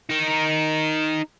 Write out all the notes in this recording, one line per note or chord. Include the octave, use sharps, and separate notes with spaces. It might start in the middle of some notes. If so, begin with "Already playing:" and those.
D#4 A#4